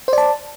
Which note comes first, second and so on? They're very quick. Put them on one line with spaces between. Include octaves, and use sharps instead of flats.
C5 D5 A5